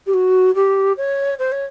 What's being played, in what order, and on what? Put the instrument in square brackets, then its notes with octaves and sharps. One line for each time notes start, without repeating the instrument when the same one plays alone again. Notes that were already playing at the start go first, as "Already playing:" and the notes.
[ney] G4
F#4
G4
C#5
C5
C#5